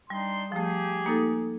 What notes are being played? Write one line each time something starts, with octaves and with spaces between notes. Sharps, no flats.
G3 D4 D#4 C6
F3 A3 G4 G#4
A#3 D#4 A4